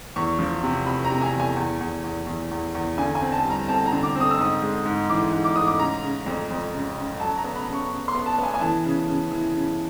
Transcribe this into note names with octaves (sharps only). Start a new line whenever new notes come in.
E2 C#6
F3
C3
C3 B5
A#5
C3
G#5
E2
G#5
E2
E2
E2
E2
E2
E2
D3 G#5
G#5
C4
A5
G3
A#5
C4 A5
A#5
D3
D6
C4 D#6
E6
G#2 D#6
G#3
G#2
E3 D6
G#2
D6
G#2 D#6
D6
C#3 A#5
C#3
F2
F2
C#3
C#3
F#3 A5
A#5
B3
B5
C#3
C#6
C#3
C6
B3
A5
B3
G#5
G#5
E3 A5
C#3
C#3
E3
C#3